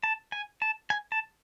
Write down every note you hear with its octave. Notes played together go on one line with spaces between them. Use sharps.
A5
G#5
A5
G#5
A5